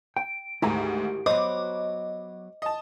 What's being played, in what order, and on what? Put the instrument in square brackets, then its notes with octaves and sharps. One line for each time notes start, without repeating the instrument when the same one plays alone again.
[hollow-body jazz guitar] G5 [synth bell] D7
[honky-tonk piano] D2 G#2 [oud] D#3 G4 [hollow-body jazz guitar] E4 G#5 A#5
[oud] F#3 B3 [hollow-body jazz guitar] C5 [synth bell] D#5 [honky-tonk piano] D6
[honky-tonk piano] D#5 A5